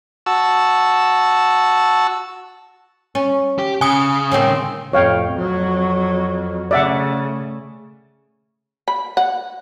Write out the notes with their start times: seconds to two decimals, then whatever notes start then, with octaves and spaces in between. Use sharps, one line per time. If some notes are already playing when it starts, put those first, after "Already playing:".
0.26 F#4 A5 E6
3.15 C#4
3.59 G4
3.81 C#3 G#5 D#6
4.32 A2 D#3 C4
4.93 F2 A2 C#5 F5 G5
5.34 F2 F#3
6.71 C#3 A3 D5 E5 F#5
8.88 B5
9.17 F#5